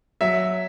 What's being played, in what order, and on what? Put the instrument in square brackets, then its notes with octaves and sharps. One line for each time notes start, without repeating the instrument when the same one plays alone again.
[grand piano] F#3 E5